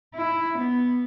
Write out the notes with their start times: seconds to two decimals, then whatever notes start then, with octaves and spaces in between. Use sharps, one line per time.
0.15 E4
0.57 B3